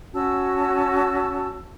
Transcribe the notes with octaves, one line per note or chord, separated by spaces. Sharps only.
C#4 F#4 A5 E6